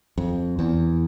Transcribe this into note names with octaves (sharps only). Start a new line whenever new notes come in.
F2
E2